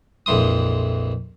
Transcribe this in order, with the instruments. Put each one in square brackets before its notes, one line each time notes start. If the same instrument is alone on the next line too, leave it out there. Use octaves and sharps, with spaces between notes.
[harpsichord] A#1 F2 E3 C6 D#6